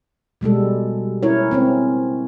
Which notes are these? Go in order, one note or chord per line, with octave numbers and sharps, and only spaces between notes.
B2 G3 G#3 A4
C#4 E4 A#4 C#5
C4 C#4 C#5